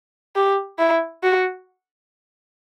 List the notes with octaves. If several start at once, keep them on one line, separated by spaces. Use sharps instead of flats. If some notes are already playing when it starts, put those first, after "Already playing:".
G4
E4
F#4